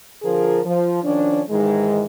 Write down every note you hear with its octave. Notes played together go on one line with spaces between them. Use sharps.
D3 F3 F4 G#4 A#4
F3
D#3 F3 C#4 D4
G#2 D#3 E3 G#3